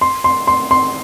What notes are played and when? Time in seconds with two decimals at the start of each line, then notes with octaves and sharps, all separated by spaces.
0.01 C6
0.24 C6
0.47 C6
0.71 C6